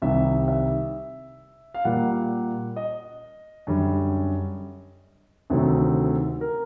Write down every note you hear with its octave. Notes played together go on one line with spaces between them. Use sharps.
C2 C3 D#3 G3 E5
E5
F5
A#2 G3 A#3 F#5
D#5
F#2 D3 G3
D2 C3 D#3 F#3 A3
A#4